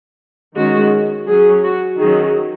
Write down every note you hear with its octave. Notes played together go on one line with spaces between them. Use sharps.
D#3 G#3 C#4 F#4
F#3 C#4 G#4
F#4
D#3 F#3 C#4 G#4